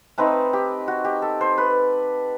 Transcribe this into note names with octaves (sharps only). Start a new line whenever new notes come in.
A3 C4 D#4 B4
G4
F#4
G4
A4
C5
B4